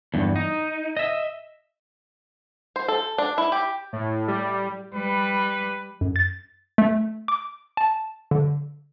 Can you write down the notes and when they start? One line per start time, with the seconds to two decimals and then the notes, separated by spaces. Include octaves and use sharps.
0.14 E2 G2
0.36 D#4
0.97 D#5 E5
2.76 C5
2.88 A4
3.18 D4
3.38 E4
3.52 G4
3.93 A2
4.28 G3
4.94 G3 B4
6.01 F#2
6.16 A6
6.78 A3
7.28 D6
7.77 A5
8.31 D3